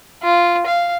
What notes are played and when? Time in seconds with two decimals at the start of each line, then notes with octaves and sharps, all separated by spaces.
0.23 F4
0.66 F5